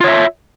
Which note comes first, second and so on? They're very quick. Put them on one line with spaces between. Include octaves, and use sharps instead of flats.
F4 C#5 E5